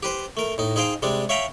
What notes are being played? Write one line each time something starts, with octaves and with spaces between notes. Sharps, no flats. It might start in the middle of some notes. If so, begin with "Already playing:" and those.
G4 B4 C5
A3 A#4
A2 D#4
D#4 G#4 C5 F5 G5
C3 G3 G#3 D4
C#5 E5 F5 G5 A#5 B5